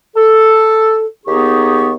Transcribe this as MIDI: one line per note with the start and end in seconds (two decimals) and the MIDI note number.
0.16 1.06 69
1.26 1.93 39
1.26 1.93 59
1.26 1.93 63
1.26 1.93 67
1.26 1.93 68
1.26 1.93 85